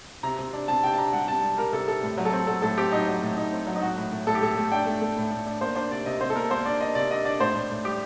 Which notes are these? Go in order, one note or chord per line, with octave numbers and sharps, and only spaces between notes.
C3 A#5
C3
D4
C3 A5
C3 G5
A5
D4 A#5
G3 F#5
C3 A5
G3
G3 A#4
C3 A4
C3 A4
A2
F#3
A4
C4
F#3 A4
A2 A4
C4 G4
F#3 D#4
F#3
A2
A2 D#4
C4
F#3
D#4
A2 F#4
A2
A2
A2 A4
G4
A2 A4
A3
D4 G5
A3
A3
A2
A2
D4
A#3 C5
D4 C5
C3 D5
C3 D#5
C3 C5
A4
A#3 A#4
A#3 C5
D4 D5
D4 D#5
C3 D5
D4 D#5
D4 D5
A2 C5
A2
A2
G3 G4